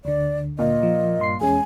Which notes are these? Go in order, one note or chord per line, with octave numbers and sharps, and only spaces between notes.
D2 D3 D5
A#2 D#5
F3
G2 C6 C7
E2 G#3 C#4 G#5